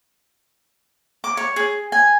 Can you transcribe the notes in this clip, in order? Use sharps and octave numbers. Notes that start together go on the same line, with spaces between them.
D6
C#5
G#4
G#5